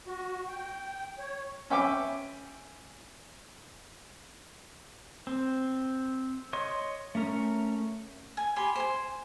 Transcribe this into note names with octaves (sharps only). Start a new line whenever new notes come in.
F#4
G5
C#5
C#4 E5 G5 D6
C4
C#5 D#5 C6
A3 C#4 A#4
G#5
G4 G#5 B5 C6
C5 G#5